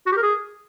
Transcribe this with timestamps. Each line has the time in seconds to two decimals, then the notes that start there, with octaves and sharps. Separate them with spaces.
0.06 F#4
0.12 G4
0.17 A#4
0.23 G#4